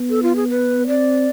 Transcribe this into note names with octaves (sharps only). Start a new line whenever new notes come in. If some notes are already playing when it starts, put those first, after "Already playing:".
Already playing: B3
A4
F4
G#4
B4
C4 D5